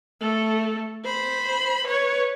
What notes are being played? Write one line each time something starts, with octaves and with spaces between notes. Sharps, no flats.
A3 A4
C5 B5
B4 C#5